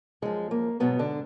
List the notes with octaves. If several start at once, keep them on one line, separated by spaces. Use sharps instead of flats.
F#2 F3 G#3
A#3
G#2 B2 F#3 B3
D3 D4